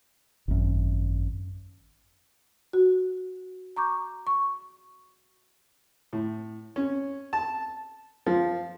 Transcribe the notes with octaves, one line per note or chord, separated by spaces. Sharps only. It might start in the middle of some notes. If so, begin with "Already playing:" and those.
G#1 F#2
F#4
A#5 C#6 D6 G6
C#6
A2
C#4
A5
F3